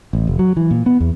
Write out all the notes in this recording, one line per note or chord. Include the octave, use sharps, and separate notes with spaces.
A1
F1
F#3
E3
A#2
B3
E2